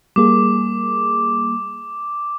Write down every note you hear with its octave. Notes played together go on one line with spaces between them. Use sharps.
G3 A#3 G#4 D6